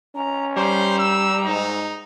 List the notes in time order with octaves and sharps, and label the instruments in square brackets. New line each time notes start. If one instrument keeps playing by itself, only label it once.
[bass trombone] C#4 [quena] A#5
[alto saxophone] G3 [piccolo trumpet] C5 [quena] A#5
[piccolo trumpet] E6
[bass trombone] G#2 [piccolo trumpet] D#4